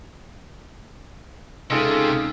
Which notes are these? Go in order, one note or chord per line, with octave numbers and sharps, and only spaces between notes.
C#2 C3 D#4 F4 G#4 A4